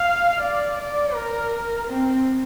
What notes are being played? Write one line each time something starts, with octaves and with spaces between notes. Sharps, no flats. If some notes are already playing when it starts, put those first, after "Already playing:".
Already playing: F5
D5
D5
A#4
C4